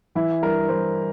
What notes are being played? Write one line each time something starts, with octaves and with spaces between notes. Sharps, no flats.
E3 E4
G2 A#4
E3 C5